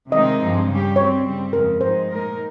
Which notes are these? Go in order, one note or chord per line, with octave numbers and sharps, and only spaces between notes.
C3 D#3 G#3 C4 D#4 D#5
G2 F3 G#3 C4
C#3 G3 C#4 G4
G2 G3 C4 C#5
C#3 G3 C4
F2 C#3 G#3 A#4
G#2 F3 G#3 D#4 C5
A#2 G#3 D#4 A#4